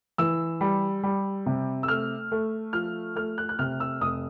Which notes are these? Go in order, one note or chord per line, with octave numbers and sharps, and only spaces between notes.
E3 E6
G3
G3
C3
E6
A3 F6
A3
F3 F6
A3 F6
F#6
F#6
C3 F6
E6
F1 D#6